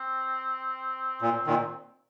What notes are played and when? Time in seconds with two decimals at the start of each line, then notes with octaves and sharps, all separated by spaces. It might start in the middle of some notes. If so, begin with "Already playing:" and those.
Already playing: C4
1.22 A#2
1.47 A#2 D#3